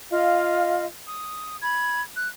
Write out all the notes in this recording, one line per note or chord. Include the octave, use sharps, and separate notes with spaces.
F4 D#5 F5
D#6
B5 G#6
F#6